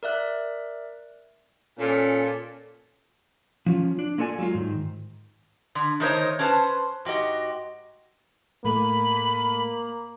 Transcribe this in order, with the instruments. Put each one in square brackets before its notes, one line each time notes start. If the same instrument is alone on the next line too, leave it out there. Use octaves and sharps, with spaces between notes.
[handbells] A#4 D5 E5 F#6
[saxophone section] A#2 A4 [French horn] C#4
[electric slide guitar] F3 C#4 F4
D4
A#3 F4 A4 D5 G#5
F#3 G#3 F4
G#2 D#3
[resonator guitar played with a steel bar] D3
D#3 A3 D#4 A#4 C5 C#5
C#4 D4 B4 C5 A5
G#2 F#4 G4 D#5
[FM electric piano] A2 A3 [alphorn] A#3 [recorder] B5